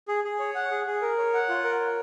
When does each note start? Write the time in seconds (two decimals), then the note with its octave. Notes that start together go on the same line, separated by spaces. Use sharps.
0.08 G#4
0.24 G#4
0.39 C#5
0.55 F#5
0.71 G#4
0.87 G#4
1.01 A#4
1.18 C#5
1.34 F#5
1.49 F4
1.64 A#4
1.80 C#5